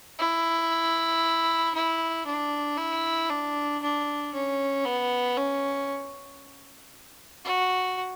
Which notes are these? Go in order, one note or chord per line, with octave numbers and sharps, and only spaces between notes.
E4
E4
D4
E4
D4
D4
C#4
B3
C#4
F#4